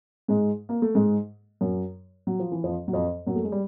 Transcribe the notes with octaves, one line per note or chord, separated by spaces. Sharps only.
G#2 G#3
A#3
A3
G#2 G#3
F#2 F#3
F#3
F3
E3
F2 F3
F#3
F2 F3
F#2 F#3
A3
G#3
G3